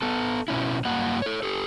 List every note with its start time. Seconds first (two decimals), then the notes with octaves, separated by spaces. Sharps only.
0.02 B3 A4
0.48 B2 C#4 E4
0.85 G2 F#3 A#3 F#5
1.22 A4 C#5
1.43 G4 A4